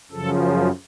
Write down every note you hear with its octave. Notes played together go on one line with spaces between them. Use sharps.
F#2 C#3 F3 A4